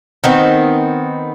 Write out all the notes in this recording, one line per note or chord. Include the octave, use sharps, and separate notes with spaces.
D#3 B3 C4